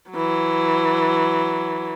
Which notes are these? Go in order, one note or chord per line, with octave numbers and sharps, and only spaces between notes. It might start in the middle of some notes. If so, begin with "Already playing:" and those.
E3 F#3